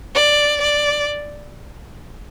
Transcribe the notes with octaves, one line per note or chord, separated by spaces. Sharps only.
D5
D5